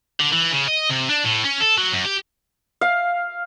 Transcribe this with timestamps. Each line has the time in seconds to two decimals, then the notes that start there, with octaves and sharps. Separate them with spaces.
0.20 D3
0.32 E3
0.52 C#3
0.68 D#5
0.90 C3
1.09 D4
1.24 A2
1.44 C#4
1.60 A4
1.78 F#3
1.93 F#2
2.06 G4
2.81 F5